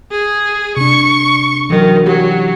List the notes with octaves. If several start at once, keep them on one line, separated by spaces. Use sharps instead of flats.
G#4
C3 D4 C#6
D#3 E3 F#3
F#3 G4